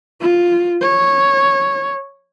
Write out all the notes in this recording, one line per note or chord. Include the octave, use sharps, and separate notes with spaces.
F4
C#5